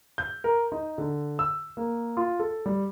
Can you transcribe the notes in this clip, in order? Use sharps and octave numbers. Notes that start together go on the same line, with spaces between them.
G6
A#4
D#4
D3
E6
A#3
F4
A4
G3